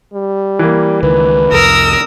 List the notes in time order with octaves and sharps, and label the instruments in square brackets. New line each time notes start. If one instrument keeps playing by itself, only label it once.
[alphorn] G3
[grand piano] E3 A#3
[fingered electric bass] C#2 D#3 [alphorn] B4
[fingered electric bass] C2 F2 [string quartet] A#4 D#6 E6